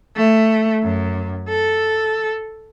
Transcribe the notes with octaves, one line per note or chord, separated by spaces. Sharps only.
A3
F#2
A4